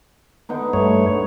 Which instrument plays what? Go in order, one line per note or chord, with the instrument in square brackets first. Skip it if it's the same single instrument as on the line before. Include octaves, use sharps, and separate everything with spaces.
[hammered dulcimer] D3 B3 D#4
[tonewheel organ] G2 A3 C#5